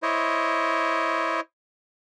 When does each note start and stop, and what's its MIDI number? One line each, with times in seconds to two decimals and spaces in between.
0.03 1.40 64
0.03 1.40 72
0.03 1.40 73
0.03 1.40 75